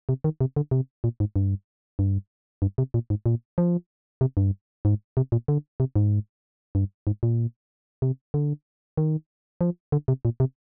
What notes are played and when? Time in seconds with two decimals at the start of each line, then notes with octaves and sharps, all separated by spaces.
0.09 C3
0.24 D#3
0.41 C3
0.56 D3
0.71 C3
1.04 A#2
1.20 G#2
1.36 G2
1.99 G2
2.62 G2
2.78 C3
2.94 A#2
3.10 G#2
3.26 A#2
3.58 F3
4.21 C3
4.37 G2
4.85 G#2
5.17 C3
5.32 A#2
5.48 D3
5.80 C3
5.96 G#2
6.75 G2
7.07 G#2
7.23 A#2
8.02 C3
8.34 D3
8.97 D#3
9.61 F3
9.92 D3
10.08 C3
10.25 A#2
10.40 C3